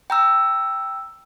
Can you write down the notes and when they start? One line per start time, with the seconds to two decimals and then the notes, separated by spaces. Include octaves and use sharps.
0.10 G5 A#5 E6